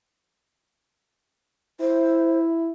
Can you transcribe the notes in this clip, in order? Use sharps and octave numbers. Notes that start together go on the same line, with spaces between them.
E4 C5